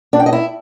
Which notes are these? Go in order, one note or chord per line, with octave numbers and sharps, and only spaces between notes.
D4
G5
D#5
E4